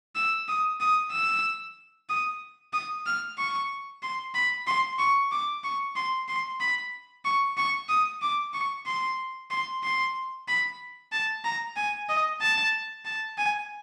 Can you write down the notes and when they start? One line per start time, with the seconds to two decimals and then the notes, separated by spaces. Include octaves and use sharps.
0.16 E6
0.49 D#6
0.81 D#6
1.12 E6
2.10 D#6
2.73 D#6
3.07 F6
3.38 C#6
4.03 C6
4.35 B5
4.67 C6
4.99 C#6
5.32 D6
5.64 C#6
5.96 C6
6.28 C6
6.61 B5
7.25 C#6
7.58 C#6
7.89 D#6
8.22 D6
8.54 C#6
8.86 C6
9.51 C6
9.84 C6
10.48 B5
11.12 A5
11.45 A#5
11.77 G#5
12.09 D#5
12.42 A5
13.05 A5
13.38 G#5